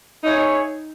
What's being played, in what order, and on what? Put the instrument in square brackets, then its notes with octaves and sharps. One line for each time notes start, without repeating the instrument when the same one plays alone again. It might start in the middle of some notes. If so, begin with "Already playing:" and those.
[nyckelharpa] D#4 [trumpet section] E4 G#4 C#5